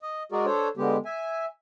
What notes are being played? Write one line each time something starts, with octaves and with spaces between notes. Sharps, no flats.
D#5
G#3 F#4 G#4 A#4 D5
D4 A4 C5 C#5
D3 G#3 B3 G4
E5 G#5